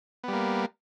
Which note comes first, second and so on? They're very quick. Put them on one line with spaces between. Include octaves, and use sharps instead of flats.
B3 G3 A#3